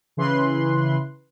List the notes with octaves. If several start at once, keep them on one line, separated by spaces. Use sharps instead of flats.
C#3 E3 B4 C6 F#6